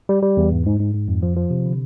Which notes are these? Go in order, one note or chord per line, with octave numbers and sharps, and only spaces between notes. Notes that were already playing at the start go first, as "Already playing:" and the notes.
G3
G3
E2
G#2
G#2
G#2
G#2
F2
F3
F3
C3
D3